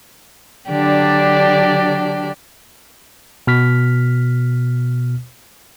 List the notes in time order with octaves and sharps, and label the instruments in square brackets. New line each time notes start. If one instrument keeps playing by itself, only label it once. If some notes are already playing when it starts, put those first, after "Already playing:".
[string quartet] D3 F#3 D4 G4 D5
[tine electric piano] B2 F6 B6